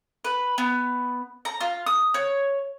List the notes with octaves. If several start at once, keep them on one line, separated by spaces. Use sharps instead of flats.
B4
B3
A#5
F4
D#6
C#5